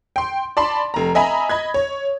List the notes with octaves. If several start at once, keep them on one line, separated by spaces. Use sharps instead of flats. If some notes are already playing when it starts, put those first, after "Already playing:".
G5 C6
D5 A5 B5 C6
F1 A#5
D#5 E5 G#5 A#5 B5
D#5 B5 G#6
C#5